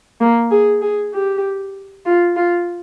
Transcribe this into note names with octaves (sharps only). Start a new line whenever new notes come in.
A#3
G#4
G#4
G4
F4
F4